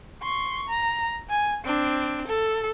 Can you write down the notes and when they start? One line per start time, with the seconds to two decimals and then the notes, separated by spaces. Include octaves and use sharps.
0.22 C6 C#6
0.68 A#5
1.29 G#5
1.64 C4 D4
2.27 A4